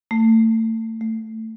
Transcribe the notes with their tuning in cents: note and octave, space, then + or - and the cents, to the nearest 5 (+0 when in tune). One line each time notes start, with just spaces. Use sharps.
A3 +30
A3 +10